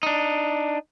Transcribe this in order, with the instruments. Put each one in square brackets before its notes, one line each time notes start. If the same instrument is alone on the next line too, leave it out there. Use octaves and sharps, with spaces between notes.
[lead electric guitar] D4 D#4